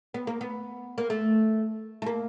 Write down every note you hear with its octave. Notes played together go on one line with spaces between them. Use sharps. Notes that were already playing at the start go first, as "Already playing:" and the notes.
B3
A#3
B3
A#3
A3
A3
A#3